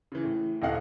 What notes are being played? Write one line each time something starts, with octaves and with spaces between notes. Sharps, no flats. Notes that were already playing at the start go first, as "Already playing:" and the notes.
C#3 E3
A2
D#1 C3 D#5 F5 F#5